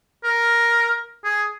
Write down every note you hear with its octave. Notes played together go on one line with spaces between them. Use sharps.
A#4
G#4